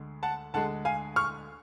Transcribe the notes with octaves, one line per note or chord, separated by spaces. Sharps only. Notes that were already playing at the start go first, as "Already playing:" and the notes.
Already playing: D2 D3 G#3
F#5 A5
D2 D3 G#3 F#5 A5
F5 G#5
C#6 F6